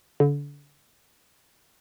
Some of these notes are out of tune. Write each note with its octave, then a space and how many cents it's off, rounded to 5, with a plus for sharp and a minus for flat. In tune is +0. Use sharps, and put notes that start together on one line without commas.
D3 -30